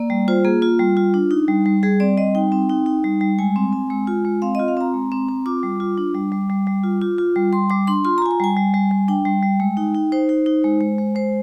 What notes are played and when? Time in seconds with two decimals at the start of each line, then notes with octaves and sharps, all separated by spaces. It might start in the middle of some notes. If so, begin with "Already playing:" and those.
Already playing: A#3 D5
0.10 G3
0.28 F4 C5
0.45 A#3 G#4
0.62 F4
0.79 G3
0.97 F4
1.14 D4
1.31 D#4
1.48 G3
1.66 G3
1.83 G3 G#4
2.00 C4 D5
2.17 G3 D#5
2.35 D#4 G5
2.52 C4
2.69 D#4
2.86 D#4
3.04 G3
3.21 G3
3.39 G#3 G#5
3.56 C4
3.73 C4
3.90 G#3
4.07 F4
4.25 G#3
4.42 C4 F5
4.55 F4 D#5
4.68 F5
4.77 C4 A#5
4.94 G#3
5.12 C4
5.29 C4
5.46 F4 D6
5.63 G3
5.80 F4
5.98 D4
6.15 G3
6.32 G3
6.50 G3
6.67 G3
6.84 F4
7.01 F4
7.18 F4
7.36 G3
7.53 G3 C6
7.70 G3 D6
7.87 D4 C6
8.05 F4 C6
8.18 A#5
8.22 F4 G#5
8.31 A#5
8.40 G3 G#5
8.57 G3
8.74 G3
8.91 G3
9.08 D4 G5
9.25 G3
9.43 G3
9.60 G#3
9.77 D#4
9.95 D#4
10.12 D#4 C5
10.29 D#4
10.46 D#4
10.64 G#3
10.81 G#3
10.98 G#3
11.15 G#3 C5